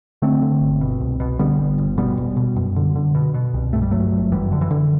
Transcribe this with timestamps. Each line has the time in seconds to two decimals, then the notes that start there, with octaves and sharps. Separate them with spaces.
0.22 D3 A3 C4
0.42 D3
0.61 G1
0.81 B2
1.00 C2
1.20 B2
1.39 D3 G3 B3
1.58 G1
1.78 G1
1.98 B2 G3 B3
2.17 E1
2.37 B2
2.56 F#2
2.76 D3
2.96 D3
3.15 B2
3.34 B2
3.54 C2
3.73 G2 A3
3.82 G3
3.91 G1 F#3 A3
4.12 G1
4.32 F#2 E3 G3
4.51 D3
4.61 E3
4.71 D3